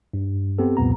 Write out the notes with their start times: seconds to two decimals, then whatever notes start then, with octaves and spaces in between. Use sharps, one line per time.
0.14 G2
0.59 B3 C4 G4 A4
0.77 C2 F2 A#2 B3 A#5